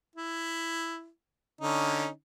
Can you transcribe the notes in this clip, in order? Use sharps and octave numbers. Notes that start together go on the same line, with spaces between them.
E4
D3 C#4 D#4